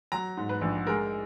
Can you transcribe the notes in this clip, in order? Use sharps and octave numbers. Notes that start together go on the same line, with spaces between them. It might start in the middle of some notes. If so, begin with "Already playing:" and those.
F#3 A#5
G#2
B4
A#1
G#3 A#4